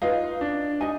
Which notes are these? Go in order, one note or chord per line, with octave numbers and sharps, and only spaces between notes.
D#4 F4 B4 F5
D4
D#4 D#5 G#5